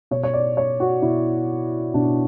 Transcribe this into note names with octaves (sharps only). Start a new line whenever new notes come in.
B2 C#5
C#5
D5
C#5
F#4
B2 E4
B2 D4